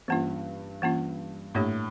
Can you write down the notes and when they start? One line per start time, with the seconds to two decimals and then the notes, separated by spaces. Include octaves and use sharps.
0.08 G2 E3 A#3 C#4 F4
0.82 E3 A#3 C#4 F4
1.55 A2 A#3 D4 G4 C#5